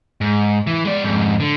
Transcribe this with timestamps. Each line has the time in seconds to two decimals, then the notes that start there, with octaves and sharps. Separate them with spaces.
0.21 G#2
0.67 E3
0.85 G#3 D5
1.04 F2 G#2
1.40 D3